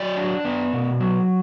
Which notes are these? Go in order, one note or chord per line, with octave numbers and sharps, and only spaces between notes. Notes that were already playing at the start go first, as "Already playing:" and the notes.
Already playing: F#3 D5
D4
B3
B2
F#3